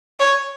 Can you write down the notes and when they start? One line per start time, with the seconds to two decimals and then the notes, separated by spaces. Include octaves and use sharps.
0.20 C#5